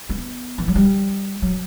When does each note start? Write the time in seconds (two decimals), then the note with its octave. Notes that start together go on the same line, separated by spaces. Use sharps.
0.09 B3
0.58 E3
0.68 F#3
0.75 G3
1.42 F#3